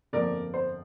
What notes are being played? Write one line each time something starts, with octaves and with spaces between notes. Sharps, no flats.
G1 F2 F3 A#3 A#4 D5
C5